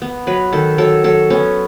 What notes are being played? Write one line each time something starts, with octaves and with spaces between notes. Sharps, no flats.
B3
F#3 B4
D#3 A4
F#3 A4
F#3 A4
B3 C#4